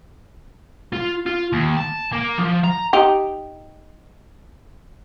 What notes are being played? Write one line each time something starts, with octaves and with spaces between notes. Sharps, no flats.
F4
F4
D#2
A5
A#3
F3
A#5
D#4 G4